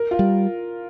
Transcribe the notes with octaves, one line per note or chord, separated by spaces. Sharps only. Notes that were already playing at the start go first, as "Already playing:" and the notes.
Already playing: A#4
F4
G3